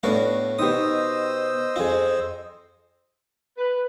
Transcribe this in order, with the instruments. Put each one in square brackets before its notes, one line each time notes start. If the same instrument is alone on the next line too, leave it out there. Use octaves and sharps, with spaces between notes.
[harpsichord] A2 F#4 F5 [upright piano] A3 B3 D4
[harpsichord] B2 D#6 [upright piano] D#4 G4 [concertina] C5 D#5 E6
[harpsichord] F2 C4 [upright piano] F4 G#4
[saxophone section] B4